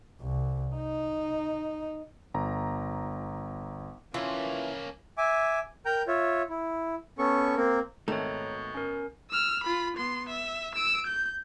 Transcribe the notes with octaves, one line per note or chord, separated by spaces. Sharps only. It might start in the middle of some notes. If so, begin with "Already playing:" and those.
C2
D#4
G1 A#5
C#3 E3 A#3 C#4 F4 C6
E5 G#5 D6
A#4 G5 A#5 G6
F4 C#5 E5
E4
B3 C#4 A4 C#6
A#3 C4 A#4
G#1 G#2 B2 D#3 A3 C#5 A#5
C#4 A#4
E6 F6
F4 B5
B3 C6
E5
E6 D7
G6